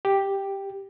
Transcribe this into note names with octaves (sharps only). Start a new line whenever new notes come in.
G4